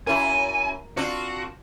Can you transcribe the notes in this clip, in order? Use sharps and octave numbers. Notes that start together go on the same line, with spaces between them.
F#2 E4 A#4 G#5
C4 D4 F4 F#4